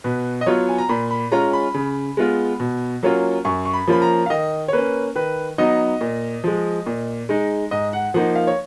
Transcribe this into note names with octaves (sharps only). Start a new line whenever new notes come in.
B2 B4
D#5
F#3 B3 F4 C#5
G#5
A#5
A#2 B5
B5
G#3 C#4 F4 A#5
B5
C#3
G#3 B3 F4
B2
F#3 A#3 C#4 F4
F#2 C#6
C#6
B5
F3 A#3 C#4 F4 B5
A#5
F5
D#3 D#5
C#5
A#3 C#4 B4
D#3 B4
F#3 B3 D#4 D#5
A#2
F3 G#3
A#2
G#3 D#4
G#2 D#5
F#5
F3 A#3 D#4 F#5
F5
C#5